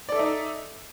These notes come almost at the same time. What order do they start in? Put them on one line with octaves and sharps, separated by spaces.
D5 A4 E5 D#4